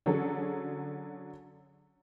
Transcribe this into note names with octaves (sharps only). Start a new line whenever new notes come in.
D3 F#3 C#4 G#4 A4